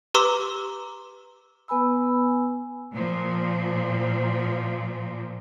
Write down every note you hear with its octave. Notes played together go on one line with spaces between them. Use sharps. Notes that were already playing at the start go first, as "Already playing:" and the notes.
G4 B4 A#5 C6 D6 E6
B3 B4 G#5 B5 E6
A#2 F3